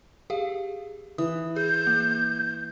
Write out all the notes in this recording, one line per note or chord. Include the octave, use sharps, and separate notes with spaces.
G4 G#4 F5
E3 D#6
G#4 G6
A#3